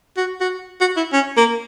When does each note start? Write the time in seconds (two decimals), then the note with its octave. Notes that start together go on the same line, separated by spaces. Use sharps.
0.17 F#4
0.41 F#4
0.81 F#4
0.97 E4
1.13 C#4
1.37 A#3